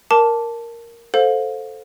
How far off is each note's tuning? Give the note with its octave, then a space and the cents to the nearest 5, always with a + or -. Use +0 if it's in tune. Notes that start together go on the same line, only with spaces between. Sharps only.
A#4 +0 A5 +0 D6 -10
A4 +0 C5 +0 F5 +30